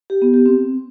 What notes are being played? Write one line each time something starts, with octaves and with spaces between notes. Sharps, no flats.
G4
B3
G4
C4